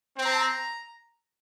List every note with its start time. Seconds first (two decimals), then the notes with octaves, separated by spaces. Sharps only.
0.18 C4
0.25 A#5
0.33 A5
0.40 A#5